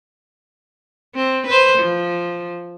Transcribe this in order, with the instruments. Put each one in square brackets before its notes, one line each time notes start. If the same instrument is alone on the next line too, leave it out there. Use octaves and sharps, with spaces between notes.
[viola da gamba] C4
B4 C5
F3